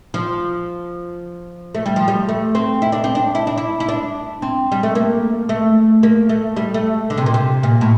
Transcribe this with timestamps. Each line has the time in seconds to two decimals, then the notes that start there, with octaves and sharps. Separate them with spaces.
0.14 F3
1.75 A3
1.86 G3
1.96 F3
2.08 G3
2.29 A3
2.55 C4
2.82 E4
2.92 D4
3.04 C4
3.15 D4
3.35 E4
3.47 D4
3.58 E4
3.80 E4
3.88 D4
4.42 C4
4.72 G3
4.83 A3
4.95 A#3
5.49 A3
6.03 A#3
6.29 A3
6.56 G3
6.74 A3
7.10 D3
7.18 C3
7.26 A#2
7.34 C3
7.63 A#2
7.81 A2